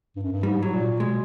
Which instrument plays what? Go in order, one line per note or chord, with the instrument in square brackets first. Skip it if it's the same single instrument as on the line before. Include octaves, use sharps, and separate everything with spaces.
[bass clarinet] G2
F#2
G2
[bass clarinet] G#2 [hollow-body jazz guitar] G3
[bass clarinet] A2 [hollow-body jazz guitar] F#3
[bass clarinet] A#2
[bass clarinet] B2 [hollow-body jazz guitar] G#3